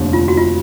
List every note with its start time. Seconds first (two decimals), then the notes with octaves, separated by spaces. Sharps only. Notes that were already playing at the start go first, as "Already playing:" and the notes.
Already playing: F1 D#2 D3
0.13 F4
0.28 F#4
0.37 F4